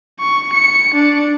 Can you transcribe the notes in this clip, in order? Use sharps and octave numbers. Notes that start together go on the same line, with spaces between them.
C#6
C#7
D4